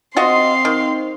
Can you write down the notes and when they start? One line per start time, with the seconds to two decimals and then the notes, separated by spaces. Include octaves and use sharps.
0.16 C4 F4 F#4 D#5 F5 C6
0.65 D#3